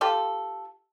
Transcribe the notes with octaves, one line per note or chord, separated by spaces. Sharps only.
F4 G4 A4